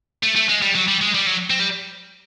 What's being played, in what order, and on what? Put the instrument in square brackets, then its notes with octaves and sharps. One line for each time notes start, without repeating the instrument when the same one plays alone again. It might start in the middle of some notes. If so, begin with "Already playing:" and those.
[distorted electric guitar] A3
A3
G#3
G3
F#3
G3
G#3
G3
F#3
C4
G3